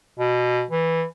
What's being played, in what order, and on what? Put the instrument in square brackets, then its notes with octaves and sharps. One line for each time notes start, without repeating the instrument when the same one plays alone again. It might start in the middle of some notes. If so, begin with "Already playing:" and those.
[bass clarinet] B2
E3